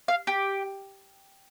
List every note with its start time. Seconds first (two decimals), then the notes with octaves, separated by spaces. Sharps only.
0.08 F5
0.27 G4